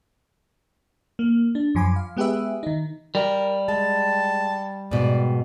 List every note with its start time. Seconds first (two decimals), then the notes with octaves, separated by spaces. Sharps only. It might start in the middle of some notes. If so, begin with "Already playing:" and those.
1.19 A#3
1.55 D4
1.75 F#2 F3 G#5 B5 D6
1.96 F5
2.17 G#3 B3 G4 G#4 B4 E5
2.63 D#3 D#4
3.15 G3 A#4
3.68 G#3 A5
4.91 G#2 B2 D5